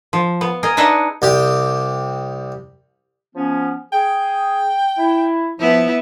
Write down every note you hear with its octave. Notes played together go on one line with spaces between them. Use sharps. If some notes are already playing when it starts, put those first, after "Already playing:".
F3
B3
G#4 A#4 D#5
D4 D#4 B4 D#5 E5 F#5
C2 G4
F3 B3 C#4
G#4 G5
E4
F3 B3 E4